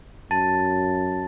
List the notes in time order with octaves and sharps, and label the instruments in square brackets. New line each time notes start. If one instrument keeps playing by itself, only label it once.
[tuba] F#2 [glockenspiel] A5 A6